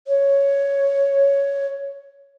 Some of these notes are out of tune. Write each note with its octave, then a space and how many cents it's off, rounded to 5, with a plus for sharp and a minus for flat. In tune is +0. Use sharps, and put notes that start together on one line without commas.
C#5 +5